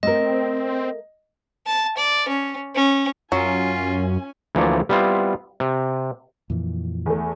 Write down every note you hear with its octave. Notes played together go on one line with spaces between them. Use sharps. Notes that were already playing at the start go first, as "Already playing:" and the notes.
A3 C4 A#4 D#5
A5
D5
C#4
C#4
F#2 F#3 C#4 F4 G#5
D2 E3 F3 A#3 C#5 D5
G3 B3 C4 E4 F4
C3
F2 A#2 E3
E2 A3